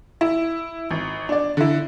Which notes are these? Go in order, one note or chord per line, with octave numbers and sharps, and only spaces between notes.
E4
G#1
D4 D5
D3 E4